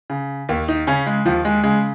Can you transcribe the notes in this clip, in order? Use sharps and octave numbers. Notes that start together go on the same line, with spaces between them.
C#3
D#2 A#3
D#4
C#3 C#4
G#3
D#2 F3
G#3
C#3 G#3